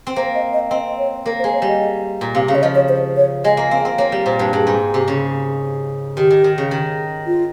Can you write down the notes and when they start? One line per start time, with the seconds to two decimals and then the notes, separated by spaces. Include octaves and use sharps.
0.07 C4
0.16 A#3 C5
0.35 D#5
0.53 D#5
0.71 C4 D#5
0.98 C#5
1.26 A#3 A#4
1.39 C5
1.44 G#3
1.53 C#5
1.62 G3
1.67 D#5
2.21 A#2
2.35 C3 F5
2.48 C#3 F5
2.55 C#5
2.62 F3 D#5
2.75 C#5
2.89 C5
3.17 C#5
3.44 G#3 D#5
3.57 A#3
3.71 C4 F5
3.85 C4
3.98 A#3 C#5
4.12 G3
4.26 A#2 C5
4.39 G2
4.53 G2 G#4
4.67 G#2
4.94 C3
5.08 C#3
6.17 D#3 G4
6.30 D#3
6.44 D#3
6.58 C#3
6.71 D#3
7.27 F4